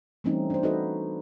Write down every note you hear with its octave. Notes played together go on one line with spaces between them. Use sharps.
E3 G3 A3 C4 C#4 D#4
D4 C5
D#4 F#4 A4 B4 C5 D#5